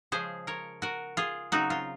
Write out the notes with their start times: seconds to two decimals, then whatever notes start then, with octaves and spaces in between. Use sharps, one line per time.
0.12 C#3 F3 G#3 C#4 G#4 C5
0.47 A#4 C#5
0.82 F#4 A#4
1.17 F4 G#4
1.52 C#3 F#3 C4 D#4 F#4
1.70 F4